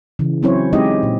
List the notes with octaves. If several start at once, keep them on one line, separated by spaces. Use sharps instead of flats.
C#3 E3
F#3 C4 C#4 E4 C5 C#5
G#3 C4 D#4 E4 G4 D#5
A#2